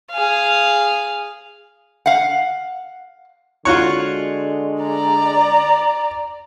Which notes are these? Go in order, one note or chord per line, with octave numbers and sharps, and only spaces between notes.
G#4 F5
F5 F#5
D3 G#3 F4 F#4 C#5
D5 A#5